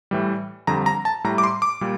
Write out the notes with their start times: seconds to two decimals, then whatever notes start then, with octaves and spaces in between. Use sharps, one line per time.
0.11 A2 E3 G3
0.67 F2 D3 G3 A#5
0.86 A#5
1.05 A5
1.24 A2 G3 A#5
1.38 D6
1.44 C6
1.62 D6
1.81 A#2 G3